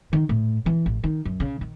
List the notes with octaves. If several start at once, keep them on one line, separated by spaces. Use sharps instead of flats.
D#3
A2
E3
A1
D#3
F#2
C#3
D#3